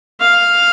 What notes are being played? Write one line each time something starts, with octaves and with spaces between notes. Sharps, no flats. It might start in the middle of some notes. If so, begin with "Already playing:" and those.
F5